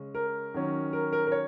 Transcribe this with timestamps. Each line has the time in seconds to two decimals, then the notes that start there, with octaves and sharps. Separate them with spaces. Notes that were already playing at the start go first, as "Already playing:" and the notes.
Already playing: C#3 G#3 C#4
0.15 A#4
0.54 D#3 F#3 C#4
0.93 A#4
1.13 A#4
1.27 A#4
1.32 C#5